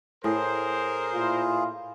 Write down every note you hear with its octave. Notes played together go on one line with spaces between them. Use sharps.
A2 G#4 A#4 C5
A#2 E4 F4